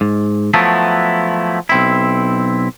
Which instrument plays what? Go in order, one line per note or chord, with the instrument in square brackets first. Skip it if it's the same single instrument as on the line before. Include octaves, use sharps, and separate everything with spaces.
[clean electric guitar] G#2
F3 F#3 A3 B3 E4
B1 C4 E4